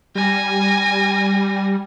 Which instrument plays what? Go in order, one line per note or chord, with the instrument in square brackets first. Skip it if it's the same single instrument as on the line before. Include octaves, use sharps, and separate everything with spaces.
[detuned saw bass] G3 [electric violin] G#5 A#6